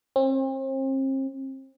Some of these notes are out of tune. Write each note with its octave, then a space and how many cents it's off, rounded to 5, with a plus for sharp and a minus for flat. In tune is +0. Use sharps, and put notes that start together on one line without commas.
C4 +40